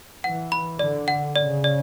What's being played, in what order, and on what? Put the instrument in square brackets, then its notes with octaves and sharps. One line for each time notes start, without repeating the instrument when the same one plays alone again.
[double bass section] E3 [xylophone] F#5
[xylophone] B5
[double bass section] D3 [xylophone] D5
[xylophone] F#5
[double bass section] C#3 [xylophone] D5
[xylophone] D5